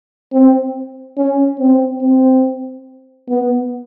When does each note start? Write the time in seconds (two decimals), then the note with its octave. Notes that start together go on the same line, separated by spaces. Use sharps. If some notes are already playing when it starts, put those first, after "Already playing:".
0.33 C4
1.17 C#4
1.59 C4
2.02 C4
3.29 B3